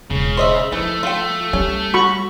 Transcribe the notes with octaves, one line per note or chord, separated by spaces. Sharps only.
E1 C#3
C5 D#5 E5
E3 F3 A3
A3 F4 G5
G3 C#4
F#4 B5 C#6